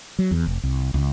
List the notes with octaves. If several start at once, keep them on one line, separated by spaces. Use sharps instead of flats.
F#3
E2
F1
C2
C#2